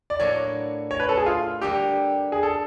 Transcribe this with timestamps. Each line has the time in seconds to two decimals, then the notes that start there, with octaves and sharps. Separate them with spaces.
0.10 D5
0.20 A2 F#3 A#3 D4 C#5
0.91 C#5
1.00 B4
1.09 A4
1.18 G#4
1.26 F4
1.61 D3 G3 A#3 G4
2.32 G#4
2.43 A4